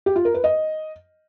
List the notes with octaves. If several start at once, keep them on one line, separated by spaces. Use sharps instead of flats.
G4
F4
A#4
B4
D#5